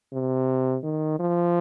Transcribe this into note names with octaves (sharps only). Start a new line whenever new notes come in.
C3
D#3
F3